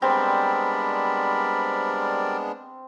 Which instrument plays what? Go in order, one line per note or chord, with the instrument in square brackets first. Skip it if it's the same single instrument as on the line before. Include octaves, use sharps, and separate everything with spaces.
[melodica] G3 A#4 D5 [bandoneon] G#3 B3 D4 [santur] C4 [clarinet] B5